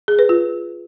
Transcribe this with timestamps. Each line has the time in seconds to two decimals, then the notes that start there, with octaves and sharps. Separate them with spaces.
0.08 G#4
0.19 B4
0.29 F4